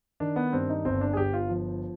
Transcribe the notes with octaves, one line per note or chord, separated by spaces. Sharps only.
D#3 D4
B3
G2 C4
D#4
G1 C4
D4
G#4
G1 G4
F4
F3